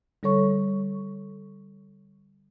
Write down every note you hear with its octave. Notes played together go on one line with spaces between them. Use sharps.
D3 G3 A4 C#5 C#6